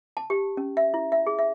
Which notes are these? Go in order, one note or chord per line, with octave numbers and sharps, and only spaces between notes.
A5
G4
C#4
E5
E4
E5
G#4
E5